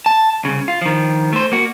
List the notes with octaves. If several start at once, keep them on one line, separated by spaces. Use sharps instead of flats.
A5
C2 C#3
F4
D#3 F3
A3 C5
A#3 F#4